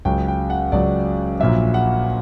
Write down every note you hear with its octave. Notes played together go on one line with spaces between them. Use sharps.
C#2 C#3 F#3 G5
G5
F#5
C#2 C#3 F#3 D5
A#1 A#2 F#3 E5
F#5